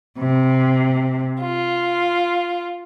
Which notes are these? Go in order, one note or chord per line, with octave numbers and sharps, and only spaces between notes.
C3
F4